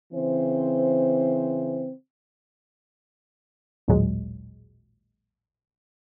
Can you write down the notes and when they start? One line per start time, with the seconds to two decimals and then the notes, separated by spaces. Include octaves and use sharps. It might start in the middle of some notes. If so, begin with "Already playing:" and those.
0.13 C#3 E3 C4 C5
3.88 A1 D#2 A#2 F#3 G#3